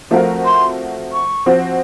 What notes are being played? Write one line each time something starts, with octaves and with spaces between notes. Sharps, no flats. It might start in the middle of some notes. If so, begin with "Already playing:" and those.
F3 A3 C4 F#4 A#4 F5
C6
C#6
F3 C4 F#4